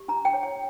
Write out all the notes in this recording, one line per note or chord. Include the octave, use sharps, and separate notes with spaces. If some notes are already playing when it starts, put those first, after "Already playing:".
Already playing: G4
D4 A#5
G5
C#5
G5